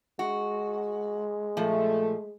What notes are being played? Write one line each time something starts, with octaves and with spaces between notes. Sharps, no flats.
G#3 F#4
A#2 F3 A3